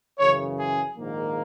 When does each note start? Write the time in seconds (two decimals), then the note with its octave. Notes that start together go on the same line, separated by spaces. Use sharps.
0.19 F#2 C#3 E3 C#5
0.58 G#4
0.97 A#1 G#2 D#3 A#3